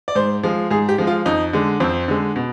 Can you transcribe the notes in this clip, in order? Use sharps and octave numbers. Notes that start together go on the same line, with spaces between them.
D5
G#2 C5
F3 G#3
G#2 G#4
G4
F3 G#3
F4
F2 D#4
D3 G#3
F2 C4
D3 G#3
B2